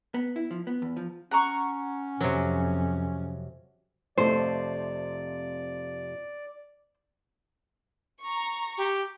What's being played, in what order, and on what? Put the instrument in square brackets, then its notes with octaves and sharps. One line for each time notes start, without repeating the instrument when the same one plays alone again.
[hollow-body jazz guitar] B3
E4
F3
B3
E2
F3
[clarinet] C#4 [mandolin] F#5 A#5 C#6
[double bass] F2 [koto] C3 F#3
[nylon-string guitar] F2 C3 A3 [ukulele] C5 [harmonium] D5
[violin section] A#5 C#6
[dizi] G4